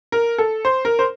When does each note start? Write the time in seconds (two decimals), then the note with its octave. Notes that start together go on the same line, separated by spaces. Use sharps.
0.12 A#4
0.38 A4
0.65 C5
0.85 A#4
0.99 C5